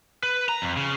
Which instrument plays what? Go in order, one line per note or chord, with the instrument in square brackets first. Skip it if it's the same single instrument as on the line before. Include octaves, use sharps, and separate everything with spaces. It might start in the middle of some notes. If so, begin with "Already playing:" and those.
[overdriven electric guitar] B4
A#5
F2
C#3